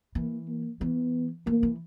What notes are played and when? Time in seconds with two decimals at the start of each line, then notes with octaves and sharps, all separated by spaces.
0.15 E3 A#3
0.48 A#3
0.81 E3 B3
1.47 E3 A#3
1.63 E3